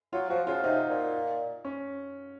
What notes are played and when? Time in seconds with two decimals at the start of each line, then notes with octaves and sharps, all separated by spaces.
0.13 F#3 F4
0.30 F3 F#4
0.47 C#3 F4
0.63 C3 D#4
0.89 A#2
1.65 C#4